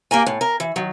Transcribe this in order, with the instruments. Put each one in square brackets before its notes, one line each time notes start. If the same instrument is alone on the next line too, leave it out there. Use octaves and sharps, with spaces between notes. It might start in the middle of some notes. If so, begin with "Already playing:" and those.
[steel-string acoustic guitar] A#3 G4 A#4 G#5
A2
A#4
E3
D#3 F#3